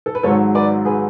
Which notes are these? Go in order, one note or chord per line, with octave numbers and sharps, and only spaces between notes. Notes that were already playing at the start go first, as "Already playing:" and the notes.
A4
B4
G#1 G#2 F#3 A4 C#5
B4 D5
G#4 B4